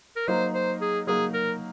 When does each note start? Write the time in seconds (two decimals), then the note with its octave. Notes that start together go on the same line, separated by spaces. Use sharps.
0.16 A#4
0.28 F#3 A#3 D#4 C5
0.54 C5
0.81 G#4
1.07 F#3 A#3 D#4 G#4
1.34 A#4